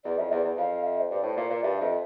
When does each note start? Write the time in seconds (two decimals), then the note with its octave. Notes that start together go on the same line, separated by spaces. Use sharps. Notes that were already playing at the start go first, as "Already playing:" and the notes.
0.05 E2 D5
0.18 F2 E5
0.31 E2 D5
0.44 E2
0.57 F2 F5
0.84 E5
1.00 C5
1.10 G2 D5
1.23 A2 C5
1.37 A#2 A#4
1.50 A#2 D5
1.63 G2 E5
1.80 F2
1.89 E5